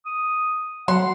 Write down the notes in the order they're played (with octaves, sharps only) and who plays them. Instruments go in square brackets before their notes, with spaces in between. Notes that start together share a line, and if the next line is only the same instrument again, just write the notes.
[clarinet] D#6
[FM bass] F#3 [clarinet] F#5 [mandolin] C6